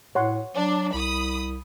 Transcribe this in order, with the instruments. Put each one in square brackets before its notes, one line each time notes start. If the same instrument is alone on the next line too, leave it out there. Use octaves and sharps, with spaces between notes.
[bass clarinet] A2 [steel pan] C#5 F#5 C6
[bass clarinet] F#3 [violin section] D4
[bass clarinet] C2 [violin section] B5 D#6